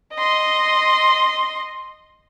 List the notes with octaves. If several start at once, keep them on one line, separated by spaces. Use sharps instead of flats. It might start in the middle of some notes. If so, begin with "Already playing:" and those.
D#5 C6